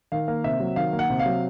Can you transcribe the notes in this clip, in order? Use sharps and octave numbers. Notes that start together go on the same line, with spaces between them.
D#3 F5
A#3
C3 E5
F#3
D#3 F5
A#3
F#5
C3
F5
F#3